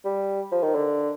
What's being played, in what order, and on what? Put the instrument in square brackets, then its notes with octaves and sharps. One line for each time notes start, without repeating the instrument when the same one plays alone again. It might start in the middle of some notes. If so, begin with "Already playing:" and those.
[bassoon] G3
F3
D#3
D3